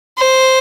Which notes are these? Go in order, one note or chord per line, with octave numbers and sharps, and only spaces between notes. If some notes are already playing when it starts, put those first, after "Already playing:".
C5